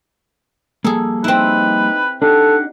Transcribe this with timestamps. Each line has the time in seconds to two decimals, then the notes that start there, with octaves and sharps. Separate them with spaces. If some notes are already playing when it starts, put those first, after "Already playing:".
0.85 F3 G3 A#3 G#4 A4
1.24 C4 D#4 E4 B4
2.22 D4 D#4 G4 A4 F#5